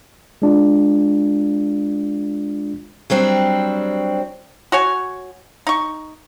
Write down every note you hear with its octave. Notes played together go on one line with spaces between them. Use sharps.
G#3 D4 F4
F#3 G3 C4 D4 G4
F#4 C#5 G#5
D#4 C#6